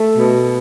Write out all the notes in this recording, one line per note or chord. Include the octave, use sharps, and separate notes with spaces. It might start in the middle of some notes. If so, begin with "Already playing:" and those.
Already playing: A3
B2